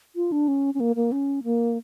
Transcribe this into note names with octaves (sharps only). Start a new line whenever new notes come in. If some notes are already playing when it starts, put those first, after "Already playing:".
F4
D4
C#4
C#4
A#3
A#3
C#4
A#3